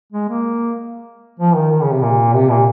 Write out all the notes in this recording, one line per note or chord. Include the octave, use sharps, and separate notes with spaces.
G#3
A#3
F3
D#3
D#3
C#3
C3
A#2
C3
A#2